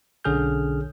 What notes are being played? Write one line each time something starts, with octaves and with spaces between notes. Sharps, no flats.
B1 D3 C#4 G#4 F6 G6